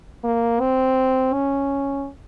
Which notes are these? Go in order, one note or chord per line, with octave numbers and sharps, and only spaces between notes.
A#3
C4
C#4